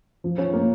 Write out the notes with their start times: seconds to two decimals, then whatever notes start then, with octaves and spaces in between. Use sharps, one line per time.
0.24 F3
0.38 C#4
0.53 A#3